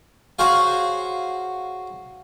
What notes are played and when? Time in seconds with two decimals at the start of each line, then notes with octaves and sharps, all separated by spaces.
0.39 F#4 G#4 C5 C#5 F5